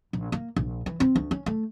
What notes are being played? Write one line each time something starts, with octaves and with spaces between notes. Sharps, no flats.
A#1
A#3
A#1
E3
C4
D2
C#4
A3